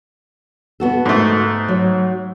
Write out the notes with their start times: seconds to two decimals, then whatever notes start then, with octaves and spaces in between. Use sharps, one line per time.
0.80 B3 F#4 A4
1.05 G#2 A3
1.68 F#3